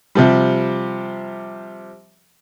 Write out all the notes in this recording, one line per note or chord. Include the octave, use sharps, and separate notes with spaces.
C3 F3 G3